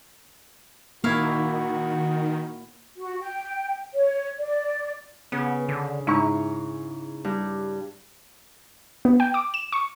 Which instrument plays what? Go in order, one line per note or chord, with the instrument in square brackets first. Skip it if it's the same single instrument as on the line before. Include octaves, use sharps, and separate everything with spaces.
[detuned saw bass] D#3 [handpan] A#3 [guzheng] E4 C#5 F5 [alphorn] F#4
[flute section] F#4
G5
C#5
D5
[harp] C#3 [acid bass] B3
[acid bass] D3
[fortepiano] G#2 A#5 C#6 [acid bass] E4
[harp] G2
[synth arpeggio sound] B3
G5
D6
E7
C#6